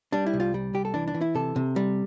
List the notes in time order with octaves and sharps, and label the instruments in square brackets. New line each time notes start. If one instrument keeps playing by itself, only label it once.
[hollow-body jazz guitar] G3 D4
E4
C2
F4
G3
C2 G4
A4
E3 D4
D4
E3
E4
C3 A4
C3
G3